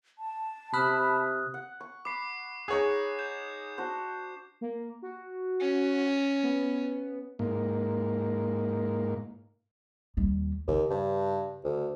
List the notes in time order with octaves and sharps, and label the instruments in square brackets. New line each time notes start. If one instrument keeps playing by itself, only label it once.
[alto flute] A5
[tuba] C3 [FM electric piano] B5 [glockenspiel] D#6 F6 F#6
[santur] F#5
C#6
[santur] B5 [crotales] D6 C7
[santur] D#4 D#5 F#5 [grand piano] G#4 C#5
[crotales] G6 E7
[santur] D4 F#4 C5
[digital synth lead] A#3
F#4
[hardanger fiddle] C#4
[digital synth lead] B3
[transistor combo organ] G#2 A#3
[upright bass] D#2 G3
[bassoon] D#2 [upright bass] C#3
[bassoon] G2
D2